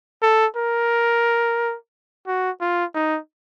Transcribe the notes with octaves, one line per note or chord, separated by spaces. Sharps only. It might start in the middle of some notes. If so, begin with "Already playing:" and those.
A4
A#4
F#4
F4
D#4